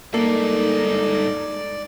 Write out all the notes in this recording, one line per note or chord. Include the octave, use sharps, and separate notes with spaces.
G2 G#3 A#3 D#4 A4 D5